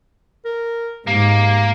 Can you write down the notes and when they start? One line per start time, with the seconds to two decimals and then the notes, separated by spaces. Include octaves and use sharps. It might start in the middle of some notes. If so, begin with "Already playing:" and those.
0.45 A#4
1.07 G#2 A#3 G4